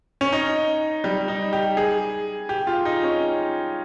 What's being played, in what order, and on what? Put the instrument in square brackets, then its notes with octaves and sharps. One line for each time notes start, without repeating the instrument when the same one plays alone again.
[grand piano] C#4
D#4
G3
D#4
G4
G#4
G4
F4
D#4
C#4